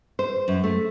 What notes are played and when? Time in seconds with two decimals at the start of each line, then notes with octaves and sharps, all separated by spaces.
0.19 C5
0.48 F#2
0.64 A3